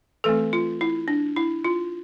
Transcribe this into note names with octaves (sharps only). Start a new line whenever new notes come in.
E3 A3 C4 A4
F4
E4
D4
E4
F4